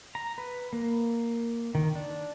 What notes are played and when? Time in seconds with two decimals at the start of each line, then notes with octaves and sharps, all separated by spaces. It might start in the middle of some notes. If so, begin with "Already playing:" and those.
0.15 A#5
0.38 B4
0.73 A#3
1.75 D#3
1.95 D4